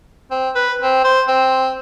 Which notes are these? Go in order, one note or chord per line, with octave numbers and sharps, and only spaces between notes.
C4
B4
C4
C5
C4